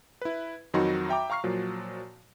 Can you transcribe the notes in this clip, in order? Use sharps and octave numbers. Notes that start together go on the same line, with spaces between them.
E4 B4
F2 D#3 F#3 D#4 F#4 C6
E5 G5 A#5 D6
F5 A#5 C#6 F6 C7
A#2 F3 F#3